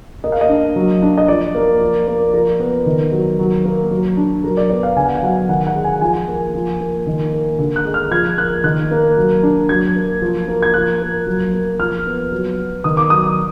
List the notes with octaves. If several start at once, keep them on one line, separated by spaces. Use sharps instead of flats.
A#3 D#5
F5
D#5
D4
F#3
D4
D#5
F3 D5
A#3
F3
A#3
F3 A#4
B3
D#3
F#3
F#3
A#3
F#3
D4
F#3 A#4
D5
B3 D5
F5
D3 G#5
F#5
F5
F#3 F#5
D#3 F#5
F#5
G#3
G#5
F3 G#5
A#3
F3
A#3
D#3
A#3
D3
F#6
G#3
F6
F3 G#6
A#3 F#6
D#3 F#6
A#3
F#3
D4
F#3 G#6
A#3
F3
A#3
G#6
F3 F#6
A#3
F#3
A#3
F3 F6
B3
F#3
B3
D#3 D#6
D6
F#3 D#6
D#6